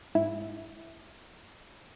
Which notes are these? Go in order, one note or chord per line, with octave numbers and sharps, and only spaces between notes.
G#2 E4